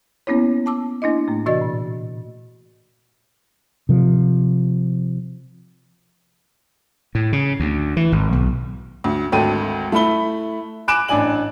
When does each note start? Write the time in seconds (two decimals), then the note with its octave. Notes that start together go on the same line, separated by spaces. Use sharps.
0.27 A#3 B3 C#4 E4 C#5
0.66 A5 D6 E6
1.02 A#3 D4 E4 D#5
1.28 A2 A3
1.46 C3 E3 F#4 D5 D#5 A6
1.61 A#2
3.89 C3 F3
7.15 A2
7.33 C#3
7.60 D2
7.97 E3
8.12 G#1
8.33 B1
9.04 D2
9.32 G#1 D2 A4 G5 D#7
9.92 A3 E4 B5 G7
10.88 G#5 B5 D6 F#6 D7 E7
11.08 A1 D4 D5 G#5 F#7